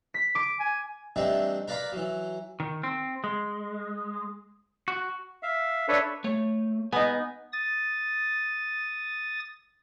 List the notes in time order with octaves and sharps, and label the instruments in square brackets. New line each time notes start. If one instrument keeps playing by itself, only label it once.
[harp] B6
D6 D7
[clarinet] G#5
[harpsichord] E3 G3 A3 C4 D4 D#4
A#4 B4 D5 F5 A#5 B5
E3 F#3
[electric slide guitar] D#3
C4
G#3
F#4
[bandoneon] E5 F5
D4 A4 B4 C#5 E5
[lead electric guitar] A3 [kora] C#5
[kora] B3 D#4 [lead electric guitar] G#5
[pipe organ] D#6 A6